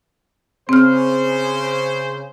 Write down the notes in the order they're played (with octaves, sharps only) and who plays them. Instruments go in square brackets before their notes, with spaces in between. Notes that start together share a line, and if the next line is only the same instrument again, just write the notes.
[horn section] C#3 C5 [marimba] C4 F6